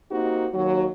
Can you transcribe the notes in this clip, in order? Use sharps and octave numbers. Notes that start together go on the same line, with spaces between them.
A#3 C4 D#4 F#4 G4
D#2 F#3